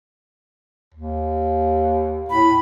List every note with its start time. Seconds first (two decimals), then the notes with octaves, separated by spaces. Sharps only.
0.94 D#2
2.30 A2 B5